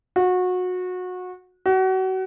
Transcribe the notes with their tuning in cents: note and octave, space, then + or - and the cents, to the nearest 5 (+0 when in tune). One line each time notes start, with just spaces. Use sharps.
F#4 -25
F#4 +30